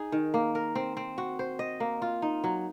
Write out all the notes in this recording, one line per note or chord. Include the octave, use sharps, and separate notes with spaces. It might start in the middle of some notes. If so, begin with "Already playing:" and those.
Already playing: D#4 G#4
D#3
A#3
A#4
C4
C4
F#4
C5
D#5
A#3
F4
D#4
F#3